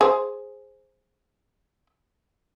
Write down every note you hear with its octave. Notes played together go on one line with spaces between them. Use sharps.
G#4 C5